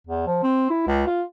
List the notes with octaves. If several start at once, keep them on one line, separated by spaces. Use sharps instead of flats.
E2
F3
C4
E4
C#2
F4